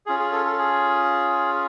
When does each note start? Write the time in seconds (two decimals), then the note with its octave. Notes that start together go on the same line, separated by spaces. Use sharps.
0.06 C#4 F4 G#4
0.19 G#4
0.32 A4
0.46 A4
0.58 G#4